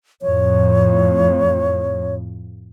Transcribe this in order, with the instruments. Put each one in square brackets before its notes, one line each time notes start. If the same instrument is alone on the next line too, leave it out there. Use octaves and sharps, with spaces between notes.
[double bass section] F2 A2 [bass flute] C#5